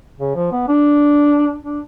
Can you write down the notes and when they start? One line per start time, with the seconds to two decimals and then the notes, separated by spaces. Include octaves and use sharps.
0.19 C#3
0.36 F3
0.52 B3
0.68 D4
1.65 D4